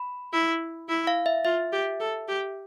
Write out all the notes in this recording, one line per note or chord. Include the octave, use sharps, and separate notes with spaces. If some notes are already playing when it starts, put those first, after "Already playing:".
Already playing: B5
E4
E4
F5
E5
F4 E5
G4
A4
G4